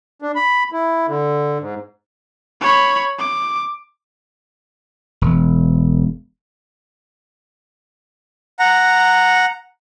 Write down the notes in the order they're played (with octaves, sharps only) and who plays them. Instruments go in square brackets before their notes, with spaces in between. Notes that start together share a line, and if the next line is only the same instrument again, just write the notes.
[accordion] D4
B5
E4
D3
G#2
[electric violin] C#5 B5
D6
[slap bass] E1
[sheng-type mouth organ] F#5 A#5